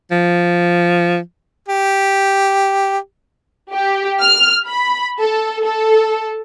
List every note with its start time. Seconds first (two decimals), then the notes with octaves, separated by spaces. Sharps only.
0.11 F3
1.68 G4
3.73 G4
4.21 F6
4.67 B5
5.21 A4
5.63 A4